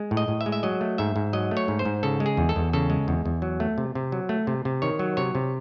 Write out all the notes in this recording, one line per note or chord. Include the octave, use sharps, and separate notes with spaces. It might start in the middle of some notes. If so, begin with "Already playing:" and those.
Already playing: G#3
A2
D#5
A2
E5
G#3
E5
F#3 D#5
A3
G#2 E5
G#2
F#3 D#5
A3
C#5
G#2
C5
G#2
C#3 A4
G#3
G#4
E2
A4
E2
C#3 A4
G#3
E2
E2
F#3
A3
C3
C3
F#3
A3
C3
C3
D#3 C#5
F#3
C3 C#5
C3